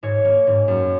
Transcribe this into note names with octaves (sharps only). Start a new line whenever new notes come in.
G#2 C#5
A#3
G#2
F#2